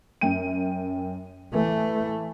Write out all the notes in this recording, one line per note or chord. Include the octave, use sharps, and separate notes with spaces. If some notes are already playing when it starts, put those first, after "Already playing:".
F#2 G5 D#7
E3 A3